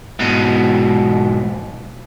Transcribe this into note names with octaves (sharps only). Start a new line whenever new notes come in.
G#2 B2